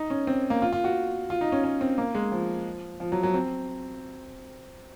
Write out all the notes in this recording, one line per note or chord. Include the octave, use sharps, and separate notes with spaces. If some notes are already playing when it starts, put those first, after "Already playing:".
Already playing: D#4
C#4
C4
A#3
F4
F4
F#4
F4
D#4
C#4
C#4
C4
A#3
G#3
F3
F3
F#3
F#3
C4